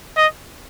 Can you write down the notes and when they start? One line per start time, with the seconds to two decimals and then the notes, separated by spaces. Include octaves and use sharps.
0.18 D#5